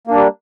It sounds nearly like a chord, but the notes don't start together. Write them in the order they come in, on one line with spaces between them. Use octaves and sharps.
A#3 D4 G3